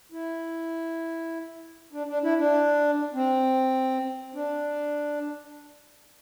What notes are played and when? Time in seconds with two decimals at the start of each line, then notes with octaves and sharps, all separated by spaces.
0.12 E4
1.93 D4
2.08 D4
2.23 E4
2.38 D4
3.14 C4
4.35 D4